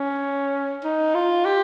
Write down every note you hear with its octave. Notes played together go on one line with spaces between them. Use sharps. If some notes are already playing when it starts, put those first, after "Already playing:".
Already playing: C#4
D#4
F4
G4